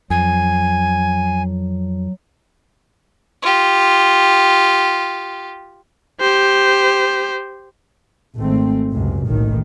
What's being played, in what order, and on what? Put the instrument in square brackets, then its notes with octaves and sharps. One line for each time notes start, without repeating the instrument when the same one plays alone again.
[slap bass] F2 [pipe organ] F#3 [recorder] G#5
[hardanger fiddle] F4 G4
[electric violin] G4 C5
[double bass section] G#1 A3 C4
C#2 F#2 C3
F#1 B1 A2 D#3